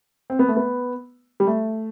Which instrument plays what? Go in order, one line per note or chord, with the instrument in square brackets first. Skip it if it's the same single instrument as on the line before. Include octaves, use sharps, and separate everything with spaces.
[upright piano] C4
B3
A3
B3
G3
A3